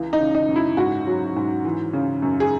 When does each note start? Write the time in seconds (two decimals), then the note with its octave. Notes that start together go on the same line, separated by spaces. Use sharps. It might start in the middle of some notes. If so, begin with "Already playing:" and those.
Already playing: C#2 E3
0.13 D#4
0.20 C#3
0.35 D#4
0.49 F#2
0.56 E4
0.77 G#2 F#4
1.07 F#3
1.36 G#2
1.65 E3
1.93 C#3
2.22 F#2
2.40 G#4